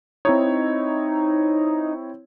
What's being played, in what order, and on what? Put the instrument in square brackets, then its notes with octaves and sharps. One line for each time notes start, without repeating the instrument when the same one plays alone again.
[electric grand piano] C4 E4 C#5 [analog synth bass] D#4